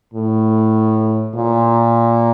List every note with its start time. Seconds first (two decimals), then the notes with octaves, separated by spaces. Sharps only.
0.14 A2
1.35 A#2